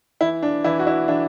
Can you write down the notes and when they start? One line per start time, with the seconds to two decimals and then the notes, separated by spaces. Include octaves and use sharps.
0.21 E3 E4
0.43 D4
0.64 E3 E4
0.79 F#4
0.87 E4
1.08 E3 D4